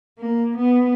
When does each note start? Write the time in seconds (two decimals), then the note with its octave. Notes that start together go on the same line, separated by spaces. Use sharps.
0.19 A#3
0.57 B3